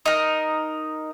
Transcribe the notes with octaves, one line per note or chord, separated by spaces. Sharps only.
D#4 A#4